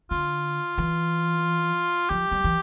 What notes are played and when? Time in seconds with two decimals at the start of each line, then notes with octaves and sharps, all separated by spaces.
0.11 D3 F4
0.78 E3
2.10 F3 G4
2.32 G3
2.44 E3